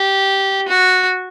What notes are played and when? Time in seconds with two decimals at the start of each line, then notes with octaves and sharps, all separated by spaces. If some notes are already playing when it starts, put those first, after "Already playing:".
Already playing: G4
0.68 F#4